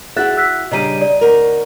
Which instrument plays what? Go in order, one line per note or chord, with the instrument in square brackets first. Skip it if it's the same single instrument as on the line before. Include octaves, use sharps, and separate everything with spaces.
[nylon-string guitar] E4 F#4 E5 [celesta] G#4 F#6 A6
[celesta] E6 F#6 B6
[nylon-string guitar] C#3 G3 D4 [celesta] D#5 A#5 D#7
[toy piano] D5
[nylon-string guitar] D2 A#4